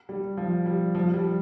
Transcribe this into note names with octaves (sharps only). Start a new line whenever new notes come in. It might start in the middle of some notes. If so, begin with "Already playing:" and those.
G3
F3
G3
F3
G3